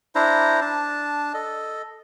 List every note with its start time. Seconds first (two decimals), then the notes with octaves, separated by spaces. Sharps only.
0.15 D4 E4 C5 A#5
0.61 D4 A5
1.34 A4 D#5